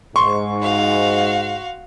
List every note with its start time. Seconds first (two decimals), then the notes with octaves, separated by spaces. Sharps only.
0.16 G#2 C6 C#6
0.62 F#4 F5